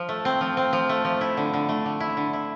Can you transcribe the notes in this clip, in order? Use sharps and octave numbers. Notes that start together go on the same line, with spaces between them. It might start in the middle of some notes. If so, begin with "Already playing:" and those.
Already playing: F3
A3
C4
F3
C4
F3
A3
F3
E4
D3
D3
A3
D3
E4
D3
E4